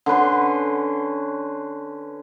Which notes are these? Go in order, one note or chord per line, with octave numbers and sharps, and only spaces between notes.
D3 C#4 B4 C6